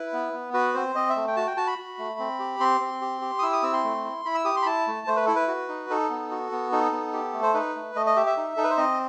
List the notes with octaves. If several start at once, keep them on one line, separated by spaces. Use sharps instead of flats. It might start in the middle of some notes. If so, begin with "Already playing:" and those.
Already playing: E4 B4
B3
B3
F#4 B4
C4 C5
C4 D#5
E5
A3
G5
F#4 A5
G5
F#4 A5
B5
F#4
A3
C4
G4
C4 C6
C4
G4
G4
D#6
E4 E6
D#6
C4 E6
C6
A3
E4
E4 B5
E6
G4 D#6
C6
B5
E4 A5
A3
A3 C5
B4
E4 A4
B4
F#4
D#4
D#4 A4
B3
F#4
B3
D#4 A4
B3
G4
A3
C5
D#4 B4
A3
A3 D#5
D#5
G4 E5
E5
D#4
D#4 A4
B4
C5
C4 D#5